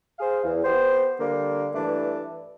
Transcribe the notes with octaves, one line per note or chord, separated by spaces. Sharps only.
G#4 C5 F5
E2
B3 G4 C5
D3 G3 A#3
G2 E3 A3 D4